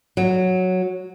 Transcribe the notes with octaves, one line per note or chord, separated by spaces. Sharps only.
F#3